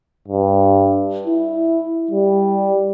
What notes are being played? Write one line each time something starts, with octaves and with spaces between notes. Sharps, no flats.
G2
E4
G3